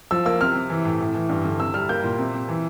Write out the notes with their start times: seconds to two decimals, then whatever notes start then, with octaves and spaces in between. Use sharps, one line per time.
0.11 F3 E6
0.26 A#3 E6
0.41 C3 F6
0.55 C3
0.70 E3
0.85 A2
1.00 A2
1.15 E3
1.29 G2
1.45 D3
1.60 C3 E6
1.74 G3 F6
1.89 A#3 G6
2.04 A#2
2.18 C3
2.34 C3
2.48 E3